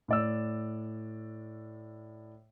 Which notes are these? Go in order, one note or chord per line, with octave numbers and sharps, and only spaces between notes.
A2 D5 E6